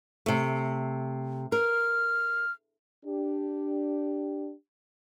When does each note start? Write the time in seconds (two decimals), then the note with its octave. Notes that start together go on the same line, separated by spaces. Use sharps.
0.26 C3 A3
1.52 A#4 F6
3.05 D4 G4